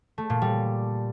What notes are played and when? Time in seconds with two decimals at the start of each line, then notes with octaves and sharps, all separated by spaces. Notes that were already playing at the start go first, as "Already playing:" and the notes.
0.18 A3
0.30 A#2
0.42 G3